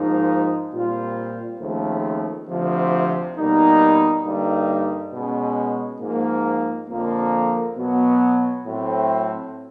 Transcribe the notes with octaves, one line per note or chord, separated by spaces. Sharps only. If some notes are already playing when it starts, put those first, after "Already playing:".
Already playing: G#2 F3 A#3 D#4
A#2 G3 C4 F4
D#2 C#3 F3 A3 C4
D2 C3 F3
B2 G3 A#3 D#4
G2 D3 G3 A#3 D#4
B2 G#3 C#4
G#2 F3 A#3
F2 D3 F3 A#3
B2 F#3 B3
A2 F#3 A3 C4